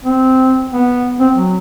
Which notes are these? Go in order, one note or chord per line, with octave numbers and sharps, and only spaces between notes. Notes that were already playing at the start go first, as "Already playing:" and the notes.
C4
B3
C4
F#3